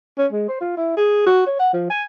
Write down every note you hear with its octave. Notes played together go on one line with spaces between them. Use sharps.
C#4
G#3
C5
F4
E4
G#4
F#4
C#5
F#5
F3
G#5